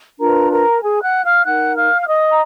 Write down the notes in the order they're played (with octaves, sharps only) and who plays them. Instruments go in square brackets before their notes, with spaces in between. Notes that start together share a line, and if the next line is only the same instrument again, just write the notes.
[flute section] D4 F4 A#4 B4 A#5
A#4 A#5
G#4 G#5
F#5 F#6
F5 F6
D#4 A#4 F#5 F#6
F5 F6
F6
D#5 D#6
A#5